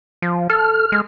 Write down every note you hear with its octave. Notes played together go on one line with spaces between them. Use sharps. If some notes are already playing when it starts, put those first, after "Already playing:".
F3
A4 F6
G#3